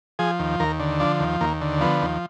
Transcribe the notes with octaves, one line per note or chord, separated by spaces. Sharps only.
F3 G#4
D#2
D#2 A#4
D3
F3 D4
D#2
D#2 A#3
D3
F3 B3
D#2